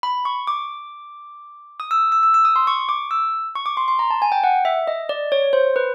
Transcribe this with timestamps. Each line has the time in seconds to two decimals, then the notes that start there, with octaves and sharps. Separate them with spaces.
0.03 B5
0.25 C#6
0.47 D6
1.80 D#6
1.91 E6
2.12 E6
2.23 E6
2.34 E6
2.45 D#6
2.56 C6
2.67 C#6
2.89 D6
3.11 E6
3.55 C#6
3.66 D6
3.77 C6
3.88 C6
3.99 A#5
4.10 A5
4.22 G#5
4.32 G5
4.44 F#5
4.65 E5
4.87 D#5
5.09 D5
5.32 C#5
5.53 C5
5.76 B4